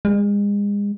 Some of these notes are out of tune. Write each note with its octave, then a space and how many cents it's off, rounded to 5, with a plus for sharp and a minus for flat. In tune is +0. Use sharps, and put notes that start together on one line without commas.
G#3 -35